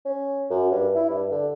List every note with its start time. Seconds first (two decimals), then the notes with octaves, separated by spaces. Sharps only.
0.05 C#4
0.50 F#2
0.72 G2
0.95 E4
1.10 G2
1.31 D3